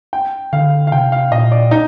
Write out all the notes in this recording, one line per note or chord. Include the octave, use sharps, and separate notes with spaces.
G5
D3 F5
F5
C3 G5
F5
A#2 D#5
D5
D#4